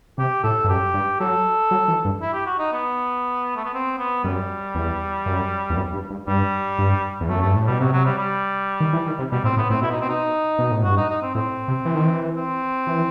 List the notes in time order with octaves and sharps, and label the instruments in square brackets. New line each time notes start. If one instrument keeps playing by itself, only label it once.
[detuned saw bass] C3 [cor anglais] G4
[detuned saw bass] A2 [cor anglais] A4
[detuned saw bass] G2
[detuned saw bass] F#2 [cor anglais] G4
[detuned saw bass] G2
[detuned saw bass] F#3 [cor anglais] A4
[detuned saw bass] F#3
E3
G2
[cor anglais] E4
G4
F#4
D#4
B3
A3
B3
C4
B3
[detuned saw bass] F#2 [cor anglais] G3
[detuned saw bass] E2
F#2
E2
F#2
G2
G2
[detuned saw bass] G2 [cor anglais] G3
[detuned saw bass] G2
E2
[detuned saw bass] F#2 [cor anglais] A3
[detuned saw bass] G2 [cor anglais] A3
[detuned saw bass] A2
[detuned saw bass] B2 [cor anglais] G3
[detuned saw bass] C3 [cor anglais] F#3
[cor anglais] F#3
G3
G3
[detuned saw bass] D#3
E3
D#3
C3
[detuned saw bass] B2 [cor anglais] G3
[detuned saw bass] A2 [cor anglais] C4
[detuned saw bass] A2 [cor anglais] B3
[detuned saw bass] A2 [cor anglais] C4
[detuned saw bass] B2 [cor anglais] E4
[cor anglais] D#4
C4
D#4
[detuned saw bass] B2
A2
[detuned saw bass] G2 [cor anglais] F#4
[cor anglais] D#4
D#4
C4
[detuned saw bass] A2 [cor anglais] C4
[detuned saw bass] C3
E3
D#3
E3
[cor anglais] C4
[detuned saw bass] E3